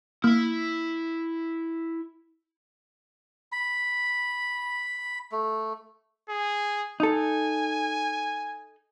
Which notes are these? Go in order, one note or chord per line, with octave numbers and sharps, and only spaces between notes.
A#3 E4 E5 F6
B5
A3
G#4
D#4 A4 G#5